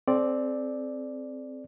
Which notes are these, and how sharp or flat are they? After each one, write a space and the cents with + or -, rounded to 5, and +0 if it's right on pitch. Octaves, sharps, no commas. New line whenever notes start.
C4 +0 A4 -45 D5 +0